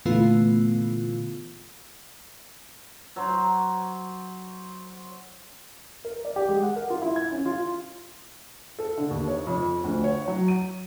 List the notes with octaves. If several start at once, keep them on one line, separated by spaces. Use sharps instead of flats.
A#2 D3 E3 A3 B3 F4
F#3 C5
A#4
D5
G4
G#3
F#5
A#4
F4
E4
G#6
C#4
F4
A4
D3
D#2
C#5
F2
D2
C#5
F#3
D#7